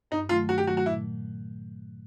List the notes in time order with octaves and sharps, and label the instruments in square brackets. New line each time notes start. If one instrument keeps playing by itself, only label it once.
[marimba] G2 [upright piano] D#4
[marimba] D#3 F#3 A3 [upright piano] F4
[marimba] G2 [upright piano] F#4
[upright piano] G4
[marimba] D#3 F#3 A3 [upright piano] F#4
[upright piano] F#4
[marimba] A#2 [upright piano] E4